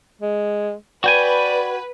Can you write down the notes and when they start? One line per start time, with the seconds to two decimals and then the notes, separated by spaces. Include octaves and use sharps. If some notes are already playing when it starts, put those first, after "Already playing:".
0.21 G#3
1.04 F#4 B4 D5 G5 G#5